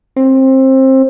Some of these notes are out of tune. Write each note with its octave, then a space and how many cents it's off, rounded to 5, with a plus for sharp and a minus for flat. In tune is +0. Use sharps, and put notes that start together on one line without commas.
C4 +20